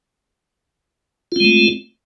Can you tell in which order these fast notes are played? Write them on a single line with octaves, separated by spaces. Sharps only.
F4 C4 G#3 A3